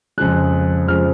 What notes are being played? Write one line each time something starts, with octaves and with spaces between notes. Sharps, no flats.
F2 C#3 F3 G#3 F#6
F2 C#3 F3 G#3 F6